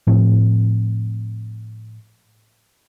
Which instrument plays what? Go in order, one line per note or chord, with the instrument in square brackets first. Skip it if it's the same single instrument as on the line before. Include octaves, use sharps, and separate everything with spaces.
[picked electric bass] A2 F3 A3 C4